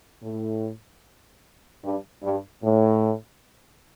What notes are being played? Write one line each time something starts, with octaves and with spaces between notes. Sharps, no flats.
A2
G2
G2
A2